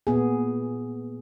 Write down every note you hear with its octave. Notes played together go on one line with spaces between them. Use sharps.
A#2 B3 G#4